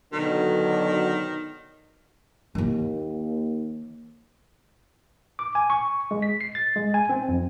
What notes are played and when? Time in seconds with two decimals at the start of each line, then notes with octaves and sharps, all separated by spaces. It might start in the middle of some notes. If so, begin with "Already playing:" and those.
0.13 B2 D3 D#3 F#3
2.55 D#2 D#3 A#3
5.39 D6
5.55 G#5
5.70 C#6
6.11 G#3
6.22 B6
6.41 C7
6.55 A6
6.76 G#3
6.94 G#5
7.09 C4
7.28 F2